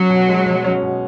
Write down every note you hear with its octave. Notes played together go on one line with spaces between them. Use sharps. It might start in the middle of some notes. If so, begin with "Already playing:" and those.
Already playing: F#3 C#4
B2
G#3
B2
C#4
B2